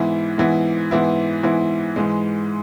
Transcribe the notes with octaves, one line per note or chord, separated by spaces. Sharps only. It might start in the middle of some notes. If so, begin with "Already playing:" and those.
Already playing: G#2 E3 B3 E4
G#2 E3 B3 E4
G#2 E3 B3 E4
G#2 E3 B3 E4
G#2 E3 G#3